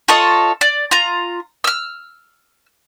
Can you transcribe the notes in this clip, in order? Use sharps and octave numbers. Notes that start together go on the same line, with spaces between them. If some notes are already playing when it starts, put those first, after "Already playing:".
F4 A4 C#5 D#5
D5
F4 A#5
E6 F6